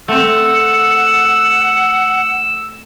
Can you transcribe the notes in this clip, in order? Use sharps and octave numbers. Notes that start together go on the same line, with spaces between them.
A3 C4 F#5 E6